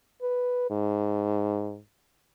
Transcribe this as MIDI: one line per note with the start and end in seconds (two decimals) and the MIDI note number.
0.22 0.66 71
0.70 1.79 44